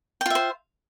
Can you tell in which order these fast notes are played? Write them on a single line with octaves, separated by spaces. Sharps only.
G5 F4 E5 C5